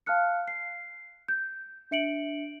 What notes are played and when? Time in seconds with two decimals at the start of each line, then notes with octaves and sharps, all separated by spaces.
0.06 F5 A5 F6 F#6 C#7
0.48 C7
1.28 G6
1.91 D4 E5 C#7 D7 F#7